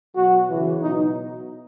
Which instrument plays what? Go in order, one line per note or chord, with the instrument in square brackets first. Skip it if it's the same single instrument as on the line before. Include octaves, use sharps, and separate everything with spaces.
[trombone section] B2 F#3 F#4
C#3 E3
B2 F#3 D#4